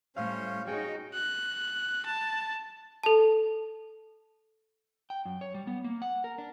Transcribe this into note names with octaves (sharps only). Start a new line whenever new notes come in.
A2 G3 C#4 C5 C#5 F5 F6
C#4 D#4 F#4 G#4 C#5 G5
F#6
A5
A4 A5
G5
F#2
C#5
G3
B3
A#3
F#5
A#4
D4